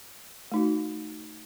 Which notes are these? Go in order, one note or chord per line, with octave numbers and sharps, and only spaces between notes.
A3 D#4 F#4